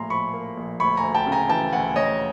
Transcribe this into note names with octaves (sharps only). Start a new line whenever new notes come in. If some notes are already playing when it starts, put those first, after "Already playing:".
Already playing: A#1 A2 A#3 G#5 A#5 C6
F3 B5 C#6
A#3
A#1
D2 B5 C#6
G#5 A#5
D2
G5 A5
C#3
G#5 A#5
E3 G5 A5
D2 F#5 G#5
D2 C#5 D#5